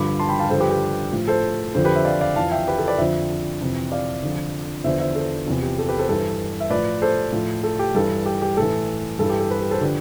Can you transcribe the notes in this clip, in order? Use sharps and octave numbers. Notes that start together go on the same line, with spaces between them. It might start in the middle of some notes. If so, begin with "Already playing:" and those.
Already playing: G2 D3 F3 B5 D6
A5 C6
G5 B5
F5 A5
G2 D3 F3 A4 C5
G4 B4
G4
A2 F3
A4 C5
F2 D3 F3 A4 C5
G4 B4
C5 E5
D5 F5
D5 F5
F2 E3 F5 A5
E5 G5
G4 B4
A4
B4 D5
F2 D3 F3 C5 E5
F2 C3 E3
D5 F5
F2 D3 F3
E2 D3 F3 C5 E5
C5 E5
A4 C5
E2 C3 F3
G4
A4
G4 B4
A4 C5
G2 E3 A4 C5
E5
A2 F3 B4 D5
A4 C5
A2 F3
A4
G4
G2 E3 A4
G4
G4
A2 E3 A4
G2 E3 A4
G4
A4
G4 B4
G4 B4
A4 C5
D3 F3 G4 B4